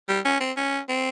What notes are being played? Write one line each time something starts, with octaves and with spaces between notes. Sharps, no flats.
G3
C#4
C4
C#4
C4